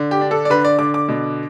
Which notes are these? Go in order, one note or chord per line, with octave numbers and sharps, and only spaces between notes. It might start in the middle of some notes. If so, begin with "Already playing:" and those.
Already playing: D3
G4
D4
A4
D5
D3 B4
D5
D3 D6
D6
B2